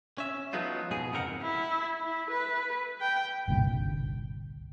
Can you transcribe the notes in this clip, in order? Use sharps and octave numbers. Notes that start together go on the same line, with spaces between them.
C#4 E5
F3 F#3 G#3 B3 D#4 F4
G#2 B2 G#4
F2 C#3 C4 A#4 F#5
E4
E4
B4
G5
G1 C2 A#2 D3